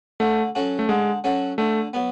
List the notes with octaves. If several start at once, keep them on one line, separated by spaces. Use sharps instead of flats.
D3 A3
F#3 C#4 F#4 A4
A3
D3 G#3
F#3 C#4 F#4 A4
D3 A3
F#3 B3